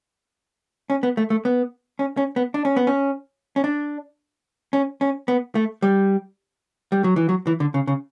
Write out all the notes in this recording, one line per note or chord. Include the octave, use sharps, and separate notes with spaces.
C#4
B3
A3
A3
B3
C#4
C#4
B3
D4
C#4
B3
C#4
C#4
D4
C#4
C#4
B3
A3
G3
G3
F#3
E3
F#3
E3
D3
C#3
C#3